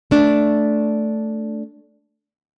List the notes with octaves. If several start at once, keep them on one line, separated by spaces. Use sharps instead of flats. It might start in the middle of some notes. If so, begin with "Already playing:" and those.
A3 D4